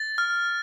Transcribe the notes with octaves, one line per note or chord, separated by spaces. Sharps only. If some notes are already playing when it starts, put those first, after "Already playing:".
Already playing: A6
F6